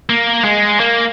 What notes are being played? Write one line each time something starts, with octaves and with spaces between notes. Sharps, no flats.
A#3
G#3
A#3